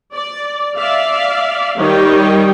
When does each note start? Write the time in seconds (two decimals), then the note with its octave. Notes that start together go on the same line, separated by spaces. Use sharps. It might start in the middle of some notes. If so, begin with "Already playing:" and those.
0.14 D5
0.77 D5 E5 F5
1.77 D#3 G3 C#5 D#5 G5